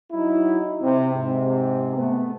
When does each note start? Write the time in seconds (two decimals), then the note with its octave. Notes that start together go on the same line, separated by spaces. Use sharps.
0.12 F#3 D#4 E4
0.82 C3
1.14 G#2 C3
1.96 A3 B3